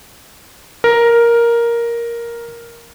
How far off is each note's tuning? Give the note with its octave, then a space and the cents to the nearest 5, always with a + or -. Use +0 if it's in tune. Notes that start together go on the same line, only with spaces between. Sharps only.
A#4 +5